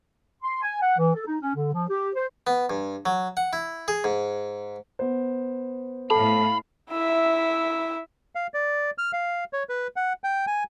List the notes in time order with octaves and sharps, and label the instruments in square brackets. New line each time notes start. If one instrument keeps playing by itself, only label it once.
[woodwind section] C6
G#5
F#5
E3
A4
D#4
C#4
D3
F3
G4
C5
[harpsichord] B3
G2
F#3
F#5
E4
G#4
G#2
[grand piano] B3 C5
[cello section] A2 F5 [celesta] A4 A5 [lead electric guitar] B5
[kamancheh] E4 E5
[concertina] F5
D5
F6
F5
C#5
B4
F#5
G5
G#5